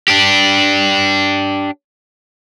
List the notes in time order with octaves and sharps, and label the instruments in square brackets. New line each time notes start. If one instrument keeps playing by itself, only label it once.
[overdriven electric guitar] D4 G4